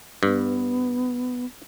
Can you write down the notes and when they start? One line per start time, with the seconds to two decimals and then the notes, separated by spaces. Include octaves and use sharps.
0.23 G2 B3